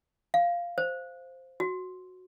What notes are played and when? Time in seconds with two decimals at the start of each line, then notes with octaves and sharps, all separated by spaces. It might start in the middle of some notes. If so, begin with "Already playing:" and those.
0.34 F5
0.78 C5
1.60 F#4